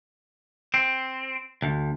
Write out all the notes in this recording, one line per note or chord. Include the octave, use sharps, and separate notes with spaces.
C4
D2